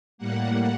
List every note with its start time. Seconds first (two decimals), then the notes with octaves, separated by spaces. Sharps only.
0.18 A2 G3 A#3 F#5